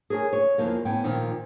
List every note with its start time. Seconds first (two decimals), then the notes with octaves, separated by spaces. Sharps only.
0.10 G#4 A#4 C#5 G#5
0.33 C#5
0.58 E2 F3 A#3
0.85 A2 B3 C#4 G5
1.04 A#2 D#3 F3 A#3